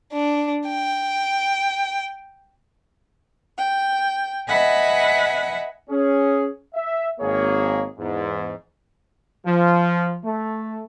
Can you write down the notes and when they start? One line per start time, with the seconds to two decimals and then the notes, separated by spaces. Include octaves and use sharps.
0.13 D4
0.69 G5
3.58 G5
4.48 B4 D#5 E5 F#5 G#5 B5
5.90 C#4 G#4
6.75 E5
7.20 G#1 A#3 G#4 C#5
7.98 E2 G#2
9.46 F3
10.24 A3